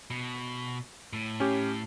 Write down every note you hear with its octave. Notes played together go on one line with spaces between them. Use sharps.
B2
A2
C#4 G4